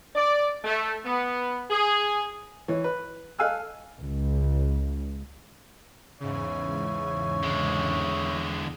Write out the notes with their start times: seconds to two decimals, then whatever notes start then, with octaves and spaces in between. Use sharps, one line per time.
0.15 D5
0.64 A3
1.05 B3
1.70 G#4
2.68 E3 C#5
2.84 B4
3.39 A4 F5 G#5 E6 F#6
3.99 C#2
6.20 E2 G#2 C#3 E3 E4 C#5 G#5
7.43 D3 G#3